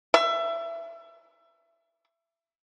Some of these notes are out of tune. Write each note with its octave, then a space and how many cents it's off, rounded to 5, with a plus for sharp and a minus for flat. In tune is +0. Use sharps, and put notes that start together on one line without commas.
E5 +25